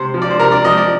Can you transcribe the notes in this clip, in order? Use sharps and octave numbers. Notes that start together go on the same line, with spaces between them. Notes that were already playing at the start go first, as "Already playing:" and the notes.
Already playing: C3 C5
F3
D5
C5
C3 A#4
D5
F3 D#5
D5